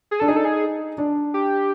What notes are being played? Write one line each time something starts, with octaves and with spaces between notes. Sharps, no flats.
G#4
D4 A4
D#4 G#4
A4
G#4
D4
G4